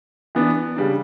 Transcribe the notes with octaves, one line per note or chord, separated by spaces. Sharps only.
E3 B3 D4
C#3 G3 D4